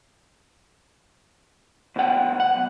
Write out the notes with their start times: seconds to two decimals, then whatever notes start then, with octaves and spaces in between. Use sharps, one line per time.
1.96 D2 B2 F#5 G5
2.40 F#5
2.56 B1